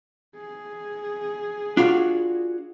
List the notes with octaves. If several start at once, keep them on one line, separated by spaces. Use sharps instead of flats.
G#4
D4 F4 F#4